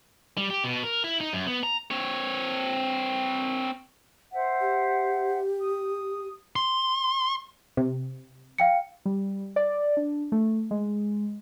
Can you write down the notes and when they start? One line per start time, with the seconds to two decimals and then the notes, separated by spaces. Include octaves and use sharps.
0.37 G3
0.50 G4
0.64 B2
0.83 A#4
1.04 E4
1.21 D#4
1.33 F#2
1.47 B3
1.63 A#5
1.91 C4 C#5
4.31 C5 E5 F#5
4.61 G4
5.61 D#6
6.56 C6
7.77 C3
8.58 F5 G5 C#7
9.06 G3
9.56 D5
9.97 D4
10.32 A3
10.71 G#3